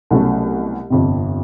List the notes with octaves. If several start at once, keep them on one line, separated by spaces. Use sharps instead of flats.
C2 B2 F#3 A3 C#4
G1 F2 C3